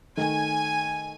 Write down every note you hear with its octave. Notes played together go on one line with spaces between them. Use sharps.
D#3 A3 G#5